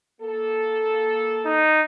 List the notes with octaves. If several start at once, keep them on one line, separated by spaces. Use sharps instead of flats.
A#3 A4
D#4